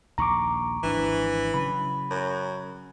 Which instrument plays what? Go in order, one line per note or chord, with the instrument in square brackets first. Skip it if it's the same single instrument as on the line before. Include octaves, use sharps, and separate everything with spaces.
[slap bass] A#1 D#2 [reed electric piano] A#5 C#6 D6
[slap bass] G#1 F3 D4 [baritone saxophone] E3
[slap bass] C#3 F#3 [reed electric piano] B5
[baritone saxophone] F#2